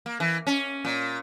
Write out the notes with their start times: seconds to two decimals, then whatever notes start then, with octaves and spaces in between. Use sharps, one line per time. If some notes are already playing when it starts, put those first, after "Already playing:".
0.06 A#3
0.20 E3
0.47 C#4
0.85 A#2